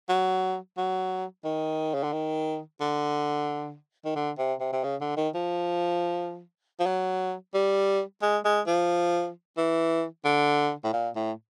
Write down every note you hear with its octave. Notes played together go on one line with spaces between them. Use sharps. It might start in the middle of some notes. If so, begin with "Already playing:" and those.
F#3
F#3
D#3
C#3
D3
D#3
D3
D#3
D3
C3
C3
C3
C#3
D3
D#3
F3
F3
F#3
G3
G#3
G#3
F3
E3
D3
A2
A#2
A2